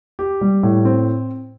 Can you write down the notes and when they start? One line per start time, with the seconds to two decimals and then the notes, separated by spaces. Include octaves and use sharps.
0.19 G4
0.41 G3
0.63 A2
0.85 C4